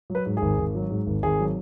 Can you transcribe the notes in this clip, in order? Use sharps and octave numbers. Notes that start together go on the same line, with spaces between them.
F#3
B4
G#2
G#4
G#1
G#1
F#3
G#2
G#1
G#1 G#4
F#3